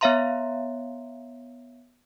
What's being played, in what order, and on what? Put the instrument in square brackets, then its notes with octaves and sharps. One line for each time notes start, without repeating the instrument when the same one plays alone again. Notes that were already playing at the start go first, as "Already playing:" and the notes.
[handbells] B3 C#5 E5 F5 A#5 C6